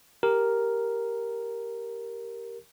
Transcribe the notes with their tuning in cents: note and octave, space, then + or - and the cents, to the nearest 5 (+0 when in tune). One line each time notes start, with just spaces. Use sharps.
G4 +0 A#4 +0